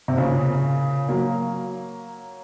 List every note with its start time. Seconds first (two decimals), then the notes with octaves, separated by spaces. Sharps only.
0.08 C3
0.18 A#2 C#3
1.08 F#3 A#3